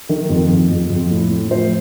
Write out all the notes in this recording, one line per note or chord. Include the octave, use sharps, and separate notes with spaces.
D#3
F2
F2
F2
F2
A2
A2
F3 C5